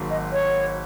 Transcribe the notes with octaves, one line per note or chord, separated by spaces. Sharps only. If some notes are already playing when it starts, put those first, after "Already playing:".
Already playing: G#1 G#2 F#3 A#3
D#5
C#5